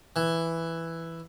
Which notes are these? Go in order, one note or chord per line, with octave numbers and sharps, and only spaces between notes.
E3